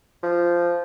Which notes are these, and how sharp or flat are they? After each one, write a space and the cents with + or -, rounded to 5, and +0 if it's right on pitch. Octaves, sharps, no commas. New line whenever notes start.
F3 -10